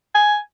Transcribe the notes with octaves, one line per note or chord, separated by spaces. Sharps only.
G#5